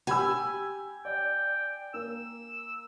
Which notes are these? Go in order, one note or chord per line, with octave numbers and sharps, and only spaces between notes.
G4 G#5 B5 E6
D5 G5
A#3 E6